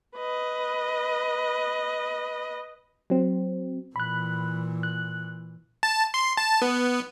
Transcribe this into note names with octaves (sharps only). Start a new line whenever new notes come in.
B4 D#5
F#3 C4
A#2 E3 B5 F#6
F#6
A5
C6
A5
B3